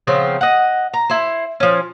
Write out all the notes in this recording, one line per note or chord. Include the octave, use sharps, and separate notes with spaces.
C#3 F3 B3 C4
D#5 F#5
A#5
E4 C5
F3 C#4